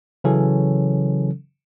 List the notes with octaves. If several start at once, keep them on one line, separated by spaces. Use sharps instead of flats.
C#3 E3 F#3 C#4 A4